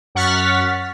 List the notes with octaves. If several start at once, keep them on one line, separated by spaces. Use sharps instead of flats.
F#2 F#5 C#6 F6 A6 B6